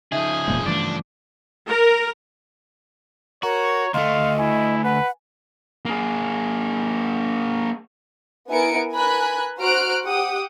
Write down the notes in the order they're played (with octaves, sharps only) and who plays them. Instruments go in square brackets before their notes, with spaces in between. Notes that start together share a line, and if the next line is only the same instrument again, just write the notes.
[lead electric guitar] C#3 F3 [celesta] D#4 D#5 E5 [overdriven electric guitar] G#4
[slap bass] E1 A#2 G#3
[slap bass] G2 E3 A3 [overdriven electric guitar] D4 [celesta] D6
[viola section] A#4
[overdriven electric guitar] F#4 [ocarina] A#4 [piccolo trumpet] C#5 [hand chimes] A#5
[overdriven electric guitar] D2 A3 [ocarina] D#5 [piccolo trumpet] F5 [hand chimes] C6
[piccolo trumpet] E4 [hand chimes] G#5
[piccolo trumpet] B4 [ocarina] F#5
[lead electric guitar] A#3 G#4
[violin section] B3 E4 A#4 G#5 C#7 D7
A#4 B4 G#5 B5 F#6
F#4 C5 A#5 F6 F#6 D7
G4 F#5 G5 D#6